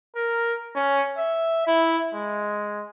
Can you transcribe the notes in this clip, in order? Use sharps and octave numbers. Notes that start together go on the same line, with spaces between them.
A#4
C#4
E5
E4
G#3